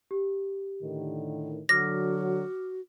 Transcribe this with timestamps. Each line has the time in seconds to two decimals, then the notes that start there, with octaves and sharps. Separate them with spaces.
0.11 G4
0.82 A2 D3 D#3
1.69 D3 F#3 F#4 D6 F6 A#6